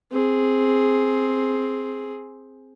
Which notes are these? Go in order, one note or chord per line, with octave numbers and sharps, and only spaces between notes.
C4 G#4